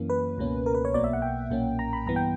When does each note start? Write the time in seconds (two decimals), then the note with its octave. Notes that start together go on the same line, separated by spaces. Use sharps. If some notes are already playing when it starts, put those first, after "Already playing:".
Already playing: F#2 E3 A#3 C#4
0.10 B4
0.38 C#2 B2 A#3 C#4
0.66 A#4
0.75 B4
0.85 C#5
0.93 B1 B2 A#3 D5
1.04 E5
1.13 F#5
1.22 G5
1.50 B1 A#2 A#3 C#4
1.79 A#5
1.93 B5
2.06 G2 E3 B3 A#5
2.16 G5